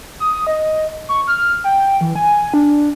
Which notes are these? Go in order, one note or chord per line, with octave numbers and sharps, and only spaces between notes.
D#6
D#5
C#6
F6
G5
E3
G#5
D4